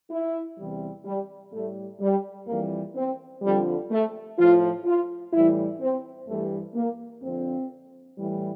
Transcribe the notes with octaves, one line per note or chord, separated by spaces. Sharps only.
E4
E2 C3 E3 G3
G3
A2 G3 A3
G3
F2 E3 G3 A#3
C4
F2 D3 F3 G3
A3
A2 F3 F4
F4
A2 E3 G3 E4
C4
G2 E3 G3 A3
A#3
F2 D3 F3 C4
A2 E3 G3